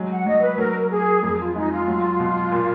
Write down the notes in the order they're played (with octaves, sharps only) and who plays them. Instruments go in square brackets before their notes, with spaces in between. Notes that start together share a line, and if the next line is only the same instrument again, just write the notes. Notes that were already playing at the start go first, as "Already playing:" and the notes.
Already playing: [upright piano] F#3 G#3
[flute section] F#5
[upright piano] F#3 [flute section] D#5
[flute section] B4
[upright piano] F#3 [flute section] A#4
[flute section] A#4
[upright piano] A#3 [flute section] G#4
[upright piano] F2 [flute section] G#4
[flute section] F4
[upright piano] G#3 [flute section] D#4
[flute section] F4
[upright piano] F#3
B2
A#2